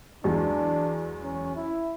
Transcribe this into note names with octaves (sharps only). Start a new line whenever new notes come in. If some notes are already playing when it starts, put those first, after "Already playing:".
E2 F#3 G#3 D4
C#4
E4